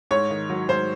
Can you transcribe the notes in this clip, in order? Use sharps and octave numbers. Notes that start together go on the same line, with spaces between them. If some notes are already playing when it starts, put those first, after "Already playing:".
G#2 C#5
D#3
F#3
G#2 C5